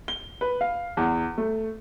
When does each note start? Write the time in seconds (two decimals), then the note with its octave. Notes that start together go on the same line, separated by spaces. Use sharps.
0.08 G7
0.41 B4
0.61 F5
0.97 E2
1.38 A3